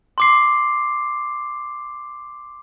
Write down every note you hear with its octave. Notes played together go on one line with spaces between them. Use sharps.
C6 D6 C7